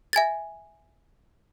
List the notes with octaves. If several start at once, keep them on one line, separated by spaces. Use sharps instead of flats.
E5 G#5 G#6 A6